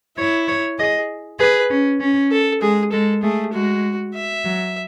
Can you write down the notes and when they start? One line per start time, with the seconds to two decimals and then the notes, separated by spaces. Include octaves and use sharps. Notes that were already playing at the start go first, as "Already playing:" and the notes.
0.18 E4 C#5
0.48 C#5
0.79 G#4 D#5
1.39 G#4 B4
1.70 C#4
2.00 C#4
2.31 A4
2.61 G#3 G#4
2.92 G#3 A4
3.23 A3 G#4
3.53 G#3 F#4
4.14 E5
4.44 F#3